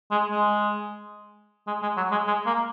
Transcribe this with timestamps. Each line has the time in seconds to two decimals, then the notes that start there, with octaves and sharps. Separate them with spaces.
0.11 G#3
0.31 G#3
1.67 G#3
1.82 G#3
1.97 F#3
2.11 G#3
2.27 G#3
2.46 A#3